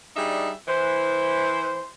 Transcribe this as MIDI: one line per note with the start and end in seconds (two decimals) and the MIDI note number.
0.16 0.51 55
0.16 0.51 62
0.16 0.51 63
0.16 0.51 68
0.16 0.51 76
0.67 1.90 52
0.67 1.90 72